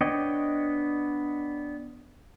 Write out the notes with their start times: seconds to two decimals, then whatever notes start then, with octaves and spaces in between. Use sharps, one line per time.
0.01 B3 D4 C#5 D#5 G5